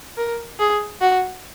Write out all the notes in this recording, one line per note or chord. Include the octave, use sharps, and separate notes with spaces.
A#4
G#4
F#4